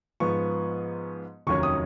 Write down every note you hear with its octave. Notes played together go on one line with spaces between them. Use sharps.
G#2 F3 B3 C#6
F1 D#2 D#3 F#3 C#4 C#6
D#6